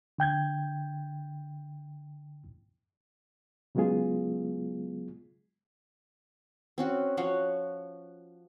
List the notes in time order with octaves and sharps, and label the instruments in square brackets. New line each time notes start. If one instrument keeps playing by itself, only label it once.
[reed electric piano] D3 G5 G6 G#6
C#3 F#3 G#3 B3 F4 G#4
[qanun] C4 C#4 F#4
F3 F#4 C#5 F5